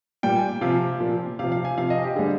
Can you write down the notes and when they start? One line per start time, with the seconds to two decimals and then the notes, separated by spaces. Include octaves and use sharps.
0.23 A#2 G3 G5
0.36 G#5
0.61 C3 F3 F5
1.00 A#2 F3
1.39 C3 F3 F5
1.52 F5
1.65 G#5
1.77 C3 F3 F5
1.90 D#5
2.03 G4
2.16 D3 G3 G#4